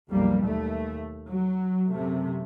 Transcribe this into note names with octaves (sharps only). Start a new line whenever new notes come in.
B1 F2 G3 A#3
D#2 A3
F#3
F#2 C3 A3